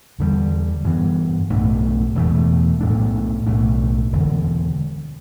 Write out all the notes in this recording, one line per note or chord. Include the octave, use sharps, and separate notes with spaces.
E2 D3 G3
G2 E3 B3
B1 A2 A3 D4
E1 E2 B2 A3
B1 A2 A3 D4
B1 A2 A3 D4
E1 D2 D3